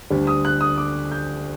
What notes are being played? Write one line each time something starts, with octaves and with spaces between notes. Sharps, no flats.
D2 D3 G3 D4
D#6
F#6
D#6
D6
G6